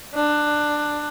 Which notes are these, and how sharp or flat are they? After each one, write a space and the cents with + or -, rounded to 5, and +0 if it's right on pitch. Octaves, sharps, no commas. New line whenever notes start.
D4 +15